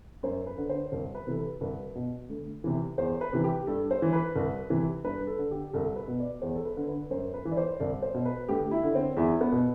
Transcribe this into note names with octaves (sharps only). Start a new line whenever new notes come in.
F#2 C5
B4
D3
C5
C2 C5
B4
C3 E3 A4
B4
C2 B4
B2
D2
C3 E3
E2 C5
B4
C3 E3
G4
G2 A4
C5
E3
B4
C2
C3 E3
G2 B4
A4
D3
G4
C2 A4
B4
B2
D5
E2 C5
A4
B4
D3
B4
F#2 C5
B4
E3
D5
C5
C2 D5
C5
B2
B4
D2 G4
E4
D3
C4
E2 E4
B3
B2